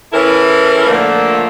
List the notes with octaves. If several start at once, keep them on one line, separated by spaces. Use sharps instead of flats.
E3 C#4 E4 A4 A#4
A#2 D3 F3 A3 A#3